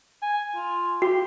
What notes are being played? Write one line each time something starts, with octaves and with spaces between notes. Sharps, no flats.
G#5
F4
F#4 G4